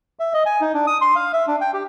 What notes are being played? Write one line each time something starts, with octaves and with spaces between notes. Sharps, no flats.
E5
D#5
G#5
D#4
D4
D#6
C6
F5
E5
D4
G5
G4